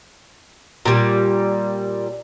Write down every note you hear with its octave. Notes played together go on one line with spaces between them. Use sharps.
A#2 G3